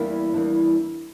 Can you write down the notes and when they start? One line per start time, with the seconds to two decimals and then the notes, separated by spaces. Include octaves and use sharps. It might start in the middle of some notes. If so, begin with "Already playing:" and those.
Already playing: E2 E3 G3 A#3 D4 E4 G4
0.34 E2 E3 G3 A#3 D4 E4